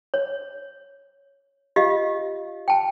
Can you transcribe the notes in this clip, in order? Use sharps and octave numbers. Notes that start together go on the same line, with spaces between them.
C#5
F4 G4 D#5 F5
G5 A5